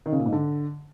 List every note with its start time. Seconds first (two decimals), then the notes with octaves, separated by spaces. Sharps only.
0.06 D#3
0.12 C#3
0.19 A#2
0.26 G#2
0.33 D3